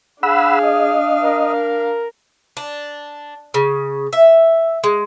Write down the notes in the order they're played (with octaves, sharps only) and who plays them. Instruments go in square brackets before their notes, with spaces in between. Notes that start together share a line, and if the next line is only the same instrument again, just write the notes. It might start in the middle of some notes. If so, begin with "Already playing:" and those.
[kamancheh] D4 F5 [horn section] G#4 [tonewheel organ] F#5 B5 E6
[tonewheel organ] D#5
[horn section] A#4
[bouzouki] D4
C#3
E5
G#3